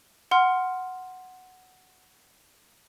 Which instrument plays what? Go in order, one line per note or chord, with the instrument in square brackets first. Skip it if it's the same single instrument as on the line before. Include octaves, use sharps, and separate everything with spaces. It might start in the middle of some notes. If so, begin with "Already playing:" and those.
[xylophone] F#5 C6 F6